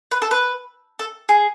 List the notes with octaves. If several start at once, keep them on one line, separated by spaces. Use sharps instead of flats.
B4
A4
B4
A4
G#4